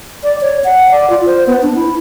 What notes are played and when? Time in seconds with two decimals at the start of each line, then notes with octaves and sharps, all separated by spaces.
0.24 D5
0.41 C#5
0.64 F#5
0.91 D5
1.10 F4
1.26 C5
1.47 B3
1.63 D4
1.76 E4